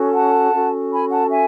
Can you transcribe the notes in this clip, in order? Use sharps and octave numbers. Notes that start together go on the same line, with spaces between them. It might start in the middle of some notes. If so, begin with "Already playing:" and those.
Already playing: C#4 F#4 A4
F#5 A5
C#4 F#4 A4
G#5 B5
F#5 A5
E5 G#5